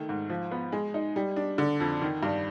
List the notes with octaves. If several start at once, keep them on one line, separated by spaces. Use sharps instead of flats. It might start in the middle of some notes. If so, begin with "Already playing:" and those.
Already playing: D#3 A3
G#2
F3
B3
G#3
D#4
G3
D4
D3
F2
D#3
G2